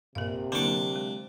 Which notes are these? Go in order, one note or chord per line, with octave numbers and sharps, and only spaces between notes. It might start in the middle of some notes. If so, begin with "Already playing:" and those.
A#1 C3 A#4 F5
D3 F#3 A#3 D4 E4 D6
G#3